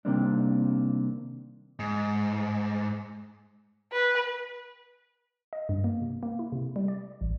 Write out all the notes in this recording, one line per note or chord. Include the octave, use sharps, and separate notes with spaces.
C3 D#3 G3 A#3 C4 D4
G#2
B4
D#5
G2
A#3
C3
A#3
E4
C3
G3
D5
A1